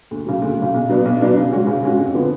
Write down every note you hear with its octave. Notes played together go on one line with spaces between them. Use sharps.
D2
C#3 F#3
D2
C#3 F#3
B1
B2 F#3 B3 D4
B1
B2 F#3 B3 D4
C#3
G#3 C#4 F#4
C#3
G#3 C#4 F#4
F2
D3 F3 B3